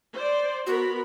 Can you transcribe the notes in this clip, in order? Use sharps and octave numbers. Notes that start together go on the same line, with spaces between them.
C5 D5
B3 F#4 A#4 B5